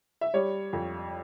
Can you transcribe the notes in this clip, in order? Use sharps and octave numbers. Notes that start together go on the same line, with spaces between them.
E5
G3 C#5
F2